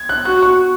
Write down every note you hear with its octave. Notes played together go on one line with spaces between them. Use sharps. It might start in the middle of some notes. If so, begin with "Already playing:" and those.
Already playing: G#6
F#6
F#4 F#6
C#6